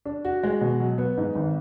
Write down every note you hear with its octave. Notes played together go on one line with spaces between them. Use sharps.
D4
F#4
G#3
B2
F#3
B3
G#2
G#1